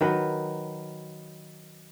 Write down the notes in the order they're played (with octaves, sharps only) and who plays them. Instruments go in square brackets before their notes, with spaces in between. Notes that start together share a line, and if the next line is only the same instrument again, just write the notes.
[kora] D#3 F#3 B4